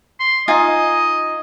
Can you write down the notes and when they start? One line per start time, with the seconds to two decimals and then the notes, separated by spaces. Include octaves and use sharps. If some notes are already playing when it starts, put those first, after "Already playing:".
0.20 C6
0.48 D#4 F4 D#5 G#5